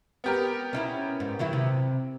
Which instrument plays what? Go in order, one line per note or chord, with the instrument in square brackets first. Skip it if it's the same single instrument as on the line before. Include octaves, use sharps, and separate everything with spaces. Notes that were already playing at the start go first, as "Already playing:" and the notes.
[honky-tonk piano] B3 G4 A#4
[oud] C#4 D#4 E4
G#2
D#3 F#3 E4
C3